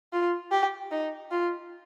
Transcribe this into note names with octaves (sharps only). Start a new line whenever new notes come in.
F4
G4
D#4
F4